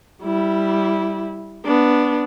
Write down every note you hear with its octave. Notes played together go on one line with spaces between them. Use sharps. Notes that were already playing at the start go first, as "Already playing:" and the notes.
G3 E4
B3 D4